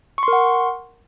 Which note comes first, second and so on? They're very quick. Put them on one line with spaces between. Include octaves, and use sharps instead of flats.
C#6 C6 A#4 F#5